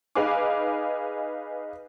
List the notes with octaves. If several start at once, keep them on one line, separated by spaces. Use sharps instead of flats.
D#4 G#4 B4 F5 G#5 D6